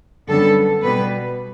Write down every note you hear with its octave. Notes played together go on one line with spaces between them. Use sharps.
F#2 D3 G3 B3 A4
B2 G3 B3 B4